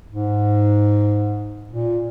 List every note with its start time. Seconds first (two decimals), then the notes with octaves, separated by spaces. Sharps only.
0.10 G#2
1.69 A#2